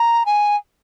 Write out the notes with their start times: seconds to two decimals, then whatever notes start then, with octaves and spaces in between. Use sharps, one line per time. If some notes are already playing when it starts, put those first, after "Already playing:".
Already playing: A#5
0.25 G#5